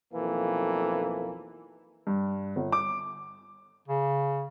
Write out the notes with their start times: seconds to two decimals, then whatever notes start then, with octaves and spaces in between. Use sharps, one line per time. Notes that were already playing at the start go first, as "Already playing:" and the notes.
0.13 B1 F2 E3 A#3 A4
2.07 G2
2.56 G1
2.72 D6
3.88 C#3